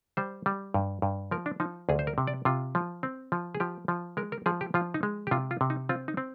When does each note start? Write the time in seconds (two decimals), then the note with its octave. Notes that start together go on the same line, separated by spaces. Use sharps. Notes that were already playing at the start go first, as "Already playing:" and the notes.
0.17 G3 C5
0.46 G3
0.74 G2
1.02 G2
1.31 F3 A#4
1.46 D4
1.60 F3 D#4
1.89 D2 G#4
1.99 C5
2.07 A#4
2.18 C3
2.27 D5
2.45 C3 F4
2.75 F3
3.03 C4
3.32 F3
3.55 G#4
3.60 F3 G4
3.88 F3
4.17 G#3 A#4
4.32 A#4
4.46 F3 G#4
4.61 G4
4.74 F3 F4
4.94 D#4
5.03 G#3
5.27 G4
5.31 C3 F4
5.51 F4
5.61 C3
5.70 D#4
5.89 C4 F4
6.08 D#4
6.17 C4